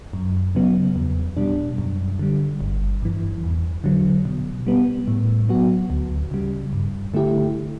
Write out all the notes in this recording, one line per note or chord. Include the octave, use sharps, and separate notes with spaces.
F#2
C#3 F#3 B3
E2
B2 G3 D4
F#2
D3 G3
G1
G2 E3
E2
D3 F#3
B2
G3 B3
A2
F#3 B3 F#4
D2
C#3 G3
G2
D3 A3 E4 G4